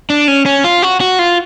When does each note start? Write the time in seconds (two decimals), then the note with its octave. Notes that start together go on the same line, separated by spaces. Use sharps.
0.10 D4
0.28 C#4
0.46 C#4
0.64 F4
0.82 F#4
1.01 F#4
1.19 F4